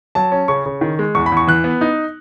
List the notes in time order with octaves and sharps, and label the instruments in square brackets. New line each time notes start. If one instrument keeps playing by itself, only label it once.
[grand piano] F#3 A5
C#4
C#3 C#6
C#3
D#3
G#3
E2 C#6
B5
E2 C#6
E3 F#6
B3
D#4